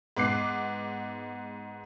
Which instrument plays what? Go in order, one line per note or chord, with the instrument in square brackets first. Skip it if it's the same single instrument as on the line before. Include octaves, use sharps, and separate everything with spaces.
[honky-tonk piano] G#2 B3 D6 F#6 C7